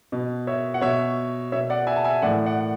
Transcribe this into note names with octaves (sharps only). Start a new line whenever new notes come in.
B2
C#5 E5
F#5
B2 C#5 E5
B2 C#5 E5
D5 F#5
E5 G#5
A5
E5 G#5
A2 E3 D5 F#5
D5 F#5
F#5